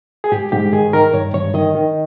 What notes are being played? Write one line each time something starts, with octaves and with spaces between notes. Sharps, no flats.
G#4
G#2 G4
G#2 G4
D#3 G#4
D#3 A#4
G2 C#5
G2 C#5
D#3 D#5
D#3